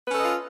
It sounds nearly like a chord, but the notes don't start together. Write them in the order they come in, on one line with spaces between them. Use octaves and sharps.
B4 C#4 A4 D#5 F4